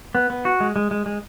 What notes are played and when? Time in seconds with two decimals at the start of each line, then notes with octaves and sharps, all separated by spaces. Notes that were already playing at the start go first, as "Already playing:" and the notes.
0.15 B3
0.30 B3
0.45 F#4
0.61 G#3
0.76 G#3
0.91 G#3
1.06 G#3